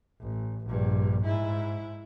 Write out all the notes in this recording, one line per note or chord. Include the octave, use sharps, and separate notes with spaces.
A1
A#1 G2
G#2 E4